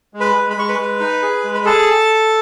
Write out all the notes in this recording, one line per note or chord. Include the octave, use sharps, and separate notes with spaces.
G#3
B4 B5
G#3
B5
G#3 C#6
B4 B5
G#3
D#4
G#4
G#3
B5
G#4 A4 A5